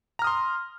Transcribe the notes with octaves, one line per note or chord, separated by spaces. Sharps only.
A#5 C6 D#6 F6